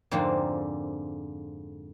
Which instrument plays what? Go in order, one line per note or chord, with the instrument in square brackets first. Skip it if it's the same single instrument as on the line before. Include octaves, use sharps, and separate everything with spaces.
[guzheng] F2 G#2 D3 A#3 C4 F4